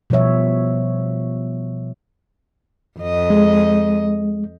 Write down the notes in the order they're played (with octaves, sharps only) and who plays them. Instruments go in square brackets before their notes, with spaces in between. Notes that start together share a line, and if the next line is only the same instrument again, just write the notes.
[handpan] B2 F3 G3 C#5 E5
[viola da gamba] F2 D#5
[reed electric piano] G#3